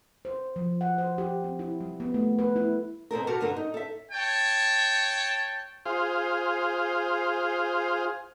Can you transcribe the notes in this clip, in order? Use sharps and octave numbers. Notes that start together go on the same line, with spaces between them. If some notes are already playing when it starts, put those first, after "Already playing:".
C5
F3
F#5
C5
G4
C4
E4
G3
B3
A3
B4
E4
B2 C4 A4 A#4
F#4 G4 A4 A#4
G2 D3 A#4
D#4
A4 E5
C#5 G5 A5
F4 G#4 C5 F5